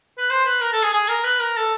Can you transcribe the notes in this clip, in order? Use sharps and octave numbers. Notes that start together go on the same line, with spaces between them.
B4
C5
B4
A#4
A4
G#4
G#4
A#4
B4
A#4
A4